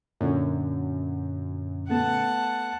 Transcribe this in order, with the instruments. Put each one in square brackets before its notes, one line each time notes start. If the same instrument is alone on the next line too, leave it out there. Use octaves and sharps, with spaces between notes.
[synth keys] F#2 [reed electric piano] A#2 D3 C#4
[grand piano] A3 B3 [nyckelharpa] F#5 A5